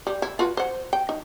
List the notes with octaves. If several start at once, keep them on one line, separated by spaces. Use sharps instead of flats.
G3
E4
F4 F#4 B4
C5 F#5
G5
D#4